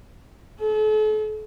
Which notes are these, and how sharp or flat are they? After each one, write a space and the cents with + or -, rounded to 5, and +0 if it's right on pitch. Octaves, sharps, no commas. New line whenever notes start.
A4 -40